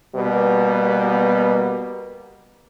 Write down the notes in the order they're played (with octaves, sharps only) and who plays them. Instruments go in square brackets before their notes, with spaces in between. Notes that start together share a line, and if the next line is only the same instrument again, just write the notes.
[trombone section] B2 G3 A#3 B3